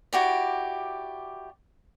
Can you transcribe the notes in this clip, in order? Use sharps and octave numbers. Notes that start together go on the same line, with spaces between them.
E4 F#4 G4 D5